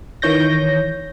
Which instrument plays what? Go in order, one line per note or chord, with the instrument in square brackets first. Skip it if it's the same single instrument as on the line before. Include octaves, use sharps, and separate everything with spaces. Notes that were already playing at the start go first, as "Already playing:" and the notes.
[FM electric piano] D#3 E3 C#5 G6 A#6